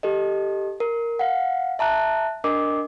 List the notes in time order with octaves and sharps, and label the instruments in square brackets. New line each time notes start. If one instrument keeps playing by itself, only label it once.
[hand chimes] G4 A4 D#5
A#4
F5 F#5
E5 A5 A#5 F#6
D4 A#4 D#5 D6